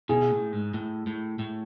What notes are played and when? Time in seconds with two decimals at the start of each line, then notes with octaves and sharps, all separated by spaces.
0.09 B2 G#4
0.31 A2
0.53 G#2
0.74 A2
1.07 A2
1.39 A2